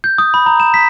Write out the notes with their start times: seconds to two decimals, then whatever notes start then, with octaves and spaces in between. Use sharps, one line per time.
0.04 G6
0.18 D#6
0.34 B5
0.46 A#5
0.60 E7
0.74 B6